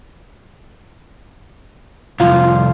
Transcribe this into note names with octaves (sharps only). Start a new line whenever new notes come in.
C2 F2 F4 F5